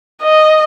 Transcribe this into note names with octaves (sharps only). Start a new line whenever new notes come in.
D#5